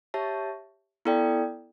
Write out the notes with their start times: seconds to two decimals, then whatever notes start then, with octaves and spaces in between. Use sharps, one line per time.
0.14 G4 C#5 E5 A5
1.05 B3 E4 A4 D5 G5